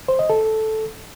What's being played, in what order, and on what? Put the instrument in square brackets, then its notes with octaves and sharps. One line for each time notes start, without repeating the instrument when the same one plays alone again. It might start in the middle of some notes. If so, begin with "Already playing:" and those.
[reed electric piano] C5
D#5
A4